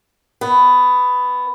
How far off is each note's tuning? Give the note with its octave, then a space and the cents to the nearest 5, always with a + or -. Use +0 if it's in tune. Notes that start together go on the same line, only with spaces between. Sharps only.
B3 +10